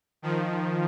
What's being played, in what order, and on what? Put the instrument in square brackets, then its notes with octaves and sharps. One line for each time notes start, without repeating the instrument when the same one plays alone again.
[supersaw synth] D#3 F3